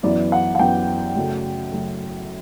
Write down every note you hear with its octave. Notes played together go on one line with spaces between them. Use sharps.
F#2 E3 B3 D5
F#5
F#5
F#2 E3 B3 G5
F#2 C#3 F#3 A3
C#3 F#3 A3